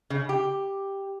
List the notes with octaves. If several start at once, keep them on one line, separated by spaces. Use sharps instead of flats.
C#3
G4